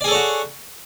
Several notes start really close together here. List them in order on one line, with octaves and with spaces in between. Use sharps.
D5 G#4 A4 C#5 F#4